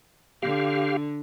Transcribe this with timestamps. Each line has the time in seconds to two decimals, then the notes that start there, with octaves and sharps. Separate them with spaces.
0.42 D3 G4 F5